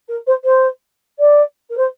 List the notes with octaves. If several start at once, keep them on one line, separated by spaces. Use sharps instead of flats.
A#4
C5
C5
D5
A#4
C5